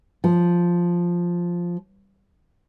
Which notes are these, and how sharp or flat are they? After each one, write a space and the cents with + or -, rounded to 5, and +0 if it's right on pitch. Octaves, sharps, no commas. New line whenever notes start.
F3 +0